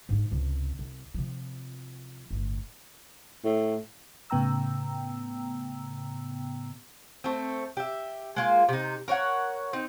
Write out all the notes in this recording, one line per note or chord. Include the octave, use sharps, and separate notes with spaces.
G#2 D#4
C#2 C3
C2
C3 F3
G1 A2
A2
A2 C#3 B3 G5 A#5 E6
A3 C4
G4 E5
G#3 A#3 F4
C3 D#4
A#4 C#5 F5 F#5
C4 D#4